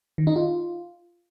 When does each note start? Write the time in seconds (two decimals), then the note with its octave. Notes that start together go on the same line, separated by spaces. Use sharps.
0.18 D#3
0.27 D#4
0.36 F4